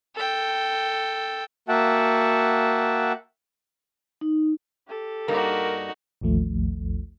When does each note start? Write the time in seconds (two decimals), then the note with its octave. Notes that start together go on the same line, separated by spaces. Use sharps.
0.15 A4 G5
1.69 A#3 F#4 E5 F#5 G5 A5
4.21 D#4
4.88 G4 A4
5.28 G2 G3 A#3 D#4 F#4 A#4
6.21 A1 D#2 F3 A3